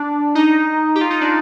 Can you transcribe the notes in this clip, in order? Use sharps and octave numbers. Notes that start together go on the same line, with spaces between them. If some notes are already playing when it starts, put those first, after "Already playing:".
Already playing: D4
D#4
G4
F4
D#4
D4